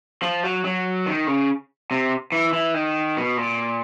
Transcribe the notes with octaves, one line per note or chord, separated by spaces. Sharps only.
F3
F#3
F#3
D#3
C#3
C3
E3
E3
D#3
B2
A#2